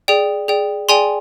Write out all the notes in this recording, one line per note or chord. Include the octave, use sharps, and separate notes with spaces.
G#4 D5 G5
G#4 D5 G5
G#4 D5 G5 G#5 C6